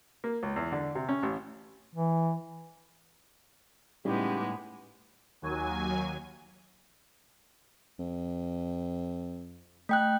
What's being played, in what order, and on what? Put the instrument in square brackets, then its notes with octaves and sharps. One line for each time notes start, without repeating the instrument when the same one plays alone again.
[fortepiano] A#3
C#2
E2
D3
C3
C#4
A1
[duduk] E3
[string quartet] A2 G#3 B3 [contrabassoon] C#3 [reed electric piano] G3 D#4 E4 [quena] G4
[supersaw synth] D#2 F#3 G#5
[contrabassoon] F2
[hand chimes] A3 G5 F#6